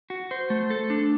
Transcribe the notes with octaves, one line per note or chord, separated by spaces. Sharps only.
F#4
C5
A3
A4
D4